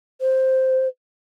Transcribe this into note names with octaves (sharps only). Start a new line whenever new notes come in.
C5